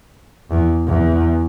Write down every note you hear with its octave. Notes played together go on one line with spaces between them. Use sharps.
E2
E2